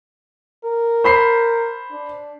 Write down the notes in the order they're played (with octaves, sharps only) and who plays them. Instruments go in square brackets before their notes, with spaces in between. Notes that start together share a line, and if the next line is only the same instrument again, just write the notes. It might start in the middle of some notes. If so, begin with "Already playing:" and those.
[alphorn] A#4
[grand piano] C5 B5 C7
[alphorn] D4